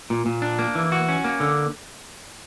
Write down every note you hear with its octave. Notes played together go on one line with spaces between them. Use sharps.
A#2
A#2
D4
A#3
E3
F#4
C#4
A#3
D3